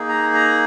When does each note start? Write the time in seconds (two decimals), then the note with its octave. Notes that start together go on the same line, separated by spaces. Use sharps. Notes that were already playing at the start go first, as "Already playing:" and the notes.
Already playing: A#3 D#4 G#4
0.09 A#5
0.34 A#5